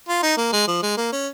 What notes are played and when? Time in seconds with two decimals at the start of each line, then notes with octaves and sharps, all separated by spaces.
0.08 F4
0.22 D#4
0.37 A#3
0.52 G#3
0.67 F3
0.82 G#3
0.97 A#3
1.12 C#4